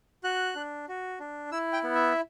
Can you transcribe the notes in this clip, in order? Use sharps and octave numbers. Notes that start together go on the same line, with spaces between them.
F#4 F#6
D4
F#4
D4
E4 E6
G5
B3
E5